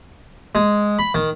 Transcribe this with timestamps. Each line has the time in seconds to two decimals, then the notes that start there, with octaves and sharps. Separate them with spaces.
0.55 G#3
0.99 B5
1.14 D#3